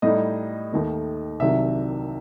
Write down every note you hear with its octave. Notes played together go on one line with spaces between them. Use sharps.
A2 G3 D#4 D#5
D#2 D#3 A3
C2 C3 D#3 F#3 E5